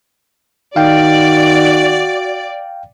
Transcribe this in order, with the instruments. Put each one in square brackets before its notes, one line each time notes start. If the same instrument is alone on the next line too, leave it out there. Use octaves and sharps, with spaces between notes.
[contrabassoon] D#3 [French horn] F#4 [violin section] D5 [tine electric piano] F5 G5